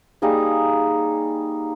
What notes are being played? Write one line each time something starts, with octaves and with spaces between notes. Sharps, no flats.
G3 A#3 D#4 G#4